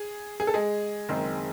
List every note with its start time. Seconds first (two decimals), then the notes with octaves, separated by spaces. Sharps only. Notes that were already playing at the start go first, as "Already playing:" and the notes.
Already playing: G#4
0.40 G#4
0.47 A4
0.54 G#3 G#4
1.09 F#1 F#2 D#3 G#3 C4